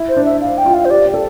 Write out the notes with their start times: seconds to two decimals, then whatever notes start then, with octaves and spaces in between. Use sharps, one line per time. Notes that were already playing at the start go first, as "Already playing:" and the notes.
Already playing: E4
0.09 C5
0.17 D4
0.25 E5
0.41 E4 F5
0.58 G5
0.66 F4
0.74 F5
0.85 C5
0.90 G4 D5
1.05 G4
1.14 A4